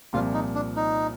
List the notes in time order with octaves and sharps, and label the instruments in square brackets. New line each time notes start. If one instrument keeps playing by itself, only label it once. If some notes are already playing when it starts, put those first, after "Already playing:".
[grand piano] C2 A#2 F3 C4 [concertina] F4
[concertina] D#4
D4
D#4